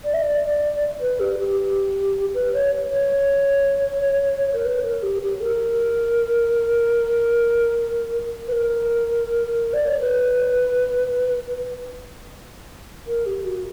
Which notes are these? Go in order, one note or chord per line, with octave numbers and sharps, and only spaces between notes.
D5
E5
D5
D5
B4
G4
G4
B4
C#5
C#5
A#4
B4
A#4
G4
G4
A#4
B4
A#4
D5
C#5
B4
A#4
G4
F#4